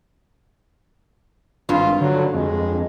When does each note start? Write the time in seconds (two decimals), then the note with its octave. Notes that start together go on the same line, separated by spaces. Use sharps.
1.69 G#1 G2 F4
2.01 D3 F#3
2.34 F2 G#3